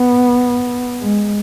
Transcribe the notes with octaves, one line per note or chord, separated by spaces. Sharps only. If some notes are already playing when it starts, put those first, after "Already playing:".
Already playing: B3
G#3